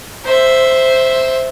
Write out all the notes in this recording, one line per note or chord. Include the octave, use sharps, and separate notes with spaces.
C5 E5